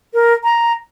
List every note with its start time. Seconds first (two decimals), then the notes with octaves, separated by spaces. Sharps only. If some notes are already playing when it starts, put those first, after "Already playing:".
0.14 A#4
0.43 A#5